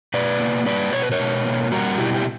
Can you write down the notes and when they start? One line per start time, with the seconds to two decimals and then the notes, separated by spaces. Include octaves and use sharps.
0.14 B2 B4 D5
0.40 A#3
0.66 G3 B4 D5
0.93 B2 C#5
1.02 B4
1.12 A#4 C#5
1.20 B2
1.45 A#3
1.72 G3 F#4 A#4
1.98 B2 E4 G4
2.14 G4